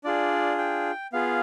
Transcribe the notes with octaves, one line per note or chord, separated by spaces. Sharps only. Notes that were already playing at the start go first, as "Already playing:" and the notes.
D4 F4 G#4 D5
G5
B3 F4 G#4 F5